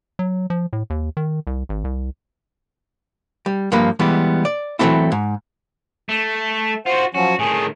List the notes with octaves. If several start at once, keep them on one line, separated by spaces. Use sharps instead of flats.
F#3
F3
A2
D#2
D#3
C2
G#1
C2
G3
G2 F3 G3 A#3 B4
E3 G3 G#3 B3
D5
E3 F#3 G#3 A3 C4 E4
G#2
A3
F4 F#4 C5 F#5
F3 F#3 C#4 F#4
A2 D#3 G#4